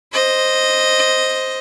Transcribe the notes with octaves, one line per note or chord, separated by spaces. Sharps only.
C5 D#5